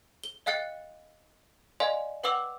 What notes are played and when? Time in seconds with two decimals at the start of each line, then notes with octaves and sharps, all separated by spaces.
0.24 G7
0.46 D#5 F5 G5 F#6 A6 C#7
1.80 D5 D#5 F5 G#5 C6
2.24 B4 F#5 G5 D6 E6 F7